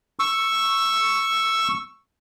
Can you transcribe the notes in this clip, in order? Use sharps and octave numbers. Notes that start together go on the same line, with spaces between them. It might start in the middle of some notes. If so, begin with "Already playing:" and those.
C#6 E6